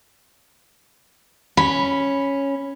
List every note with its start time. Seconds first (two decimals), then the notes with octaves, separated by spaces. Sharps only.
1.57 C#4 B5